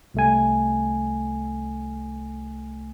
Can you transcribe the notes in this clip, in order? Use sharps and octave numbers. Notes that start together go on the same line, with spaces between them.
C2 A3 G#5